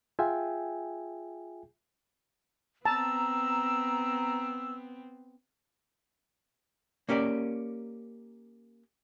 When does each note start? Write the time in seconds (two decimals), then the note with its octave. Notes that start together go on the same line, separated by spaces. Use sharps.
0.19 F4 G#4 E5 G5 G#5
2.85 B3 C4 A5 A#5 E6
7.09 A#3 C#4 G4 A#4 D5